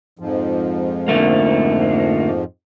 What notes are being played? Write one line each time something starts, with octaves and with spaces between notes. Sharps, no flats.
F2 G#2 F3
D3 A3 A#3